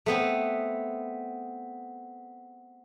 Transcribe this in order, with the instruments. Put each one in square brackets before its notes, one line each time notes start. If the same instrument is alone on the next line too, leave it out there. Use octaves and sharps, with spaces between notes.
[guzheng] A3 B3 C4